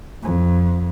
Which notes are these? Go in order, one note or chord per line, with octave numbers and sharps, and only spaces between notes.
F2